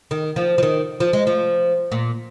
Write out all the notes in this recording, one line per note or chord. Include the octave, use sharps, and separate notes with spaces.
D#3
F3
F3
D#3
F3
G#3
F3
A#2